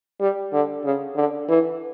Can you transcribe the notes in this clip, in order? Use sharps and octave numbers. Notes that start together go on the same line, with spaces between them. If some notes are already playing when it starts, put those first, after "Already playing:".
G3
D3
C#3
D3
E3